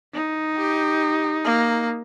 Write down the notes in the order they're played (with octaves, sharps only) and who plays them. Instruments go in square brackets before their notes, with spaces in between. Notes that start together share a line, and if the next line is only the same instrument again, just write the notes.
[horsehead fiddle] D#4
[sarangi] G4
A#3